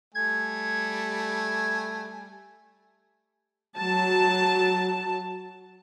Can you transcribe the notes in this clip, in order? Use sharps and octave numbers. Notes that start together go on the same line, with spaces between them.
G3 A3 G#5 G#6
F#3 A5